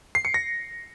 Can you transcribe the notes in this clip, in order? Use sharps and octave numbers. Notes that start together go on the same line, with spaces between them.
C7
C#7
A#6